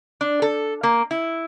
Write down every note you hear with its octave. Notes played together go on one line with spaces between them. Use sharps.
D4
A4
A#3
E4